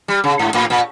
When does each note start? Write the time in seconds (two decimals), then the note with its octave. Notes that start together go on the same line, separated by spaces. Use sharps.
0.08 G3
0.24 C#3
0.39 G#2
0.54 A2
0.70 A#2